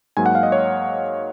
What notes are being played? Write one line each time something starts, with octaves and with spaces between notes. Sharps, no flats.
G#2 F#3 A#3 G#5
F#5
F5
D#5
C#5